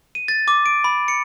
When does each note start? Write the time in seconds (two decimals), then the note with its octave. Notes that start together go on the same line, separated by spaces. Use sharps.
0.15 D#7
0.28 A6
0.48 D6
0.66 D7
0.84 B5
1.08 C#7